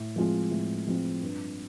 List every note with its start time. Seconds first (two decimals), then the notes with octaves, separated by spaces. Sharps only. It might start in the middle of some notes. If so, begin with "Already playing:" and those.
Already playing: A2
0.16 F3 G#3 C4 F4
0.51 A2
0.87 F3 G#3 C4 F4
1.21 G2